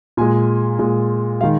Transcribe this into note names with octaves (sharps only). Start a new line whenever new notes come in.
A#2 G#3 G#5
A#2 G#3
D#3 G#3 F5